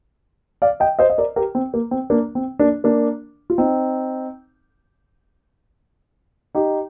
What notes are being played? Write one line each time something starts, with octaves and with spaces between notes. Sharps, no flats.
D5 F5
D#5 G5
C5 D#5
D#5
A#4 D5
G4 A#4
C4
A#3
C4
A#3 D4
C4
A#3 D4
A#3 D4
F4
C4 D#4
D#4 G4